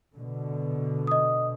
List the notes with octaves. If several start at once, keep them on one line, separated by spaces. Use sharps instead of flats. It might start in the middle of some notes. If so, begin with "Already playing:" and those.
B2 D3
D#5 D#6